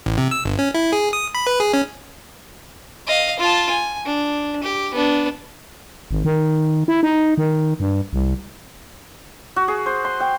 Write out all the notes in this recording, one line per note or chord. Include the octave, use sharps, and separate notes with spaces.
A1
C3
E6
G1
C#4
E4
G#4
D#6
B5
B4
G#4
C#4
D#5 F5
F4 A5
G#5
D4
G4
B3 D4
G#1
D#3
E4
D#4
D#3
G2
C2
F#4
G#4
C5
C6
G5